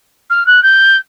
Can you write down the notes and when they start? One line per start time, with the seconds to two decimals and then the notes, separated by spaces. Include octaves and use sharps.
0.30 F6
0.46 F#6
0.62 G6